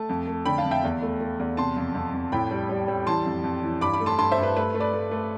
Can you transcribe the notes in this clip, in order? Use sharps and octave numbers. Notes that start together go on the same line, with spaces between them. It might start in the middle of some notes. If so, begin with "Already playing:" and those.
Already playing: A3 A5
F2
A3
D3 G5 B5
F5 A5
F2
E5 G5
E2
A3
A3
E2
C3 A5 C6
F2
F2
F2
A2 G5 B5
G3
G3
G3
E3 A5 C6
F2
F2
E3
G2 B5 D6
B5 D6
A3
A5 C6
G2 A5 C6
C5 E5
G2
B4
A3 B4
A3
B4 D5
A3
A3